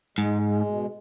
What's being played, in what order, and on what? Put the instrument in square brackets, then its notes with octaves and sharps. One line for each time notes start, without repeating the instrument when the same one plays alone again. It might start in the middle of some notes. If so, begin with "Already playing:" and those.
[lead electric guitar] G#2 [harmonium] G#3
[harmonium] G#3
B2